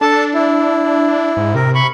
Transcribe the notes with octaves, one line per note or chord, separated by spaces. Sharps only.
D4 A4 A5
E4
G#2
C3 A#4
B5 C#6